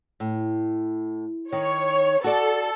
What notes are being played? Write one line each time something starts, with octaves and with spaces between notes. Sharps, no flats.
A2
D#3 C#5
F#4 A4 D5